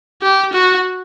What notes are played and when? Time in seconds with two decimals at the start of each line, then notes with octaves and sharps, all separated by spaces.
0.22 G4
0.53 F#4